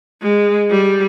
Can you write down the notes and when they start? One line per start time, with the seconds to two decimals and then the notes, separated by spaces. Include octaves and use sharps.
0.22 G#3
0.70 G3